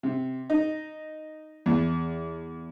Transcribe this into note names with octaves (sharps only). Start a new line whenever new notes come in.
C3
D#4
E2